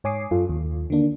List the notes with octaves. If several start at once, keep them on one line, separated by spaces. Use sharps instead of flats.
G#2 C#5 G#5 D6 D#6 C7
F#2 F4 A4
D#2
D3 D#3 A#3 D4